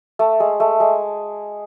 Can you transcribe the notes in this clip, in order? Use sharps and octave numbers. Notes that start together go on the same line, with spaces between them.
A3
G#3
A3
G#3